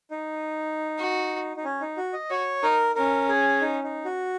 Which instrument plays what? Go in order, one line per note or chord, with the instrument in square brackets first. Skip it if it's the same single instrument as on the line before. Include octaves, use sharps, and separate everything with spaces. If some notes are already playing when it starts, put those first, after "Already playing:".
[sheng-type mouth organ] D#4
[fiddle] F#4
[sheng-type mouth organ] D#4
C#4
D#4
F#4
D#5
[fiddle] F#4 [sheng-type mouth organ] C#5
[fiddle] D#4 [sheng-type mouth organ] A#4
[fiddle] C#4 [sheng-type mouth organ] A#4
[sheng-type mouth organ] G#4
D#4
D#4
F#4